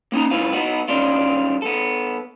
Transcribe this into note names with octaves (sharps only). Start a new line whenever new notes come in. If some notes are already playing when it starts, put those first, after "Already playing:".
A#3 C#4 D#4 A#5
G#2 C#3 E4 F4 B4 F5
B3 D#4 F#4
D#3 G3 C#4 D4 F4
B3 A4